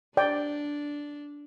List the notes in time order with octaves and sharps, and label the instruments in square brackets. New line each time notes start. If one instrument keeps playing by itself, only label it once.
[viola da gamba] D4 [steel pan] D5 G5